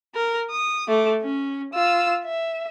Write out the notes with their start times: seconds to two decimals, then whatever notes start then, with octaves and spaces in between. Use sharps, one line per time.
0.15 A#4
0.51 D#6
0.88 A3 D6
1.21 C#4
1.73 F4 E6
2.24 E5